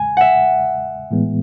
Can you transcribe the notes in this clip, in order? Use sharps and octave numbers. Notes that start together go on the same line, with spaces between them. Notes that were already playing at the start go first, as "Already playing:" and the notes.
Already playing: E2 C#3 G#3 G#5
E5 F#5
A2 E3 G#3 B3